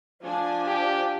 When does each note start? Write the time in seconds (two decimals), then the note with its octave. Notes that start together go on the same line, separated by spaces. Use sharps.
0.23 F3 D4 G#5
0.67 G4